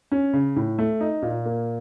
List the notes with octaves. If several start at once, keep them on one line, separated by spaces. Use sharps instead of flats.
C#4
C#3
A2
A3
D#4
A#2
A#3